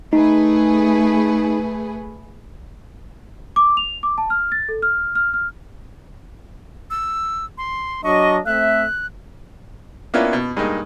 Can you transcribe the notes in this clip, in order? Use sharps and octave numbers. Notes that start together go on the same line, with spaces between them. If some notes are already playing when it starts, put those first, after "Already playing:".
A3 D#4 G#4 B4
D6
F7
D6
A5
F6
A6
A4
F6
F6
F6
E6
C6
F#3 D4 D#5 C#6
A3 C4 E5 F#6
A#3 B3 C#4 D4 E4 F4
B2
G2 G#3 A#3 D#4